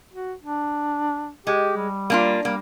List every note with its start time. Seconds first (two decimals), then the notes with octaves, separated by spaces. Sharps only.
0.13 F#4
0.43 D4
1.47 G#3 G4
1.77 G3
2.10 A#3 D4 F4
2.45 G3 A#3